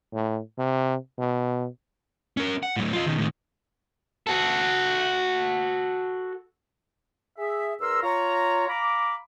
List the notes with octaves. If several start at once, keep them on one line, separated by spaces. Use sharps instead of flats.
A2
C3
B2
C#4 A#4
F#5
A2 F#3
F4 D#5
B2 D#3
A2 D#3
F#4 A4
G#4 E5
E2 A#4 A#5 C6 E6
F4 C#5 A#5
F5 A#5 B5 D6